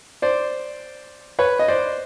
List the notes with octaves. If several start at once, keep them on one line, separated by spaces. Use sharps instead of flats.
C5 D5
B4 C#5
D#5
C5 D5